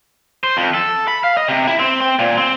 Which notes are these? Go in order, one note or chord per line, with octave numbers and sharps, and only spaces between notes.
C5
F2
A4
B5
F5
D#5
C3
E4
C4
C4
A#2
C4